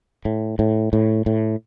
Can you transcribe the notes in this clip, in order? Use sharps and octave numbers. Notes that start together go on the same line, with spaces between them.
A2
A2
A2
A2